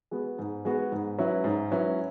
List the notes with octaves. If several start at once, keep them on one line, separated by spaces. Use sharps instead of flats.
G#3 B3 F#4
G#2
G#3 B3 F#4
G#2
F#3 C#4 E4 B4
G#2
F#3 C#4 E4 B4